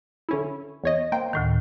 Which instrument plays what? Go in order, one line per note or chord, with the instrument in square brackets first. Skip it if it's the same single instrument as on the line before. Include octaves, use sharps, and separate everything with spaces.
[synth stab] D3 C#4 E4
E2 C#5 D#5
A#3 C5 G5
[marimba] D2 A2 D#3